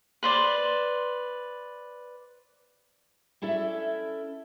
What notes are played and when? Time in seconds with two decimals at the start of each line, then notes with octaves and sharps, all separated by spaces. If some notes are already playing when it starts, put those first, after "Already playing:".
0.23 B4 C5 D5
3.42 C#4 E4 A4 D5 E5